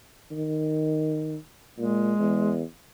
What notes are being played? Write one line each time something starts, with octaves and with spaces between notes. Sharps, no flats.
D#3
A#2 G#3
E2